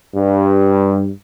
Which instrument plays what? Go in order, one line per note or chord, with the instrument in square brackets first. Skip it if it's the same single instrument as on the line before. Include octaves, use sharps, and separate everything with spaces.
[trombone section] G2